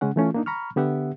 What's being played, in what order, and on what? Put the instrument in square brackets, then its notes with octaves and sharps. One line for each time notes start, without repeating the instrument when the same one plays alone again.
[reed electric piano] C#3 G#3 C#4 F#5
E3 A3 C#4 F4
A#3 D4 D#4
A#5 B5 C#6 F6
D3 B3 G4 E5 F#5